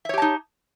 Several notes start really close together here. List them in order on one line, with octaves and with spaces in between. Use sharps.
E5 C#5 G4 A5 D#4